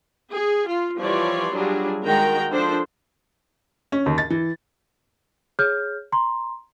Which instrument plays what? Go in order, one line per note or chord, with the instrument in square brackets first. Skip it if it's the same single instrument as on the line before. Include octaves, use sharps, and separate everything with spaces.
[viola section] G#4
F4
E3 F3 G3 C#5 D5 C6
F#3 G3 D4 F4 G#4
D#3 G#3 F#4 G5 A#5
F3 D4 A4 C5
[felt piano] C#4
D#2
A6
E3
[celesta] G#4 C#5 F6 G6
A#5 C6